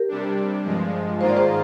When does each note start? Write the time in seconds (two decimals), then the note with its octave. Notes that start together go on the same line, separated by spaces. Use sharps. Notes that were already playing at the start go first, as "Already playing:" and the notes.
Already playing: G4 A#4
0.09 C3 G3 D4
0.64 G2 F3 G#3
1.20 G#2 D#3 A#3 F4 C5
1.29 D5
1.37 G#4 C5